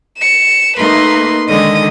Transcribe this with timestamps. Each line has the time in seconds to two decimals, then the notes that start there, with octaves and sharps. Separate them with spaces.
0.18 C#7 E7
0.77 A3 A#3 D#4 B4 C6
1.48 D3 D#3 G#3 D#5 D#6